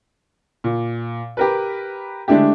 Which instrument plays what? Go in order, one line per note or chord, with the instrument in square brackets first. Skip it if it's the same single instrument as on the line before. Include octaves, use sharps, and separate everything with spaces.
[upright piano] A#2
G4 A#4 B4
D3 G#3 A3 D4 E4 G4